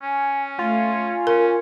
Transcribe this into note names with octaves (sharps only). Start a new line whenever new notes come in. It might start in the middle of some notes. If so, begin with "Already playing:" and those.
C#4 G#5
A3 F4
G#5
C#4 A#4